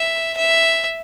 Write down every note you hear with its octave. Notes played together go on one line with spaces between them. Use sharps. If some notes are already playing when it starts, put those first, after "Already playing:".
Already playing: E5
E5